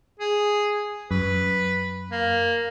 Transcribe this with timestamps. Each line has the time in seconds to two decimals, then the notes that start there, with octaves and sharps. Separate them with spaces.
0.19 G#4
1.11 F#2 B4
2.11 A#3